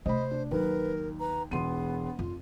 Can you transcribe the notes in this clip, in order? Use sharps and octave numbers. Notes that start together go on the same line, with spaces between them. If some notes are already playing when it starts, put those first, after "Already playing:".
C3 A3 C5 D#5 B5
D4
D#2 F#3 D#4 A#4 B4
B4 A#5
E1 B3 F4 G#4 C6 D#7
F2 F4